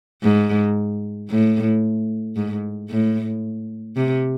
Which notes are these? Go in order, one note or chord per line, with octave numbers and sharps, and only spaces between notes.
G#2
A2
G#2
A2
C3